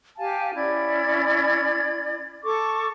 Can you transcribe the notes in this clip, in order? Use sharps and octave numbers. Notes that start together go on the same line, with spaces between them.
G4 F5 G#5 A5
C#4 E4 D5 G#6
A4 C#6 D6